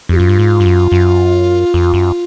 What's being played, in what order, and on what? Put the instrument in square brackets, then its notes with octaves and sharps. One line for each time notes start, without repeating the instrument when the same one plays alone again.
[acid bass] F2 [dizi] G4
[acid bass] F#2 [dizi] F4
[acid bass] G2
G#2
G2
F#2
F#2
F2
F#2